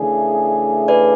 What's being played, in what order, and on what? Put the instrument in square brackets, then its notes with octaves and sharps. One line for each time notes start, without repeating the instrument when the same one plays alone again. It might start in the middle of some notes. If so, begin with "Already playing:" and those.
Already playing: [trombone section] C#3 E3 A3 D4 G#4
[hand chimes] B4 D5